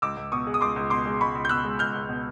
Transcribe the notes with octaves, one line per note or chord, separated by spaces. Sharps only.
C#2 D6 E6
C#2
B2 C#6 D#6
G#3
D#6
C#2 C6 D6
C#2
B2 C6 D6
G#3
C#2 B5 C#6
C#2
G6
B2 E6 F#6
G#3
C#2 F6 G6
C#2
B2